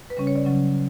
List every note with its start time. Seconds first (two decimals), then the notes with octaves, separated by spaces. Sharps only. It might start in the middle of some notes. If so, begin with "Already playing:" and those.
0.10 B4
0.17 C#3 G3 C#4 C#5
0.27 C#5
0.36 D5
0.45 C#3 F#3 C#4